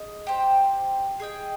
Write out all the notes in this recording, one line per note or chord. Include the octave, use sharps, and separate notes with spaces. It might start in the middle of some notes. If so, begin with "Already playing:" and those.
Already playing: G#4 D#5
G4 C5 G5
G#4 D#5 G5